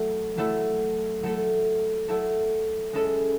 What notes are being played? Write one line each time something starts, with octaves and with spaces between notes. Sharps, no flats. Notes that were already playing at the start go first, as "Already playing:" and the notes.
Already playing: F#3 A3 E4 A4
F#3 A3 E4 A4
F#3 A3 E4 A4
F#3 A3 E4 A4
G#3 C#4 E4 A4